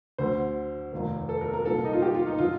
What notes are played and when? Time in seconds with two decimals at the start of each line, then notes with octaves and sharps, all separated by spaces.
0.18 D2 D3 C5
0.92 F1 D#2 D#3
1.29 A4
1.41 A#4
1.53 A#4
1.65 C2 A#2 A4
1.85 D#4
1.93 F4
2.02 G4
2.15 F4
2.27 D#4
2.38 D3 F4